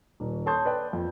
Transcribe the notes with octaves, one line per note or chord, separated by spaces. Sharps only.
D#1
A4 C#5 A5 C6 D#6 G6
B4 D5 G5 A5
F2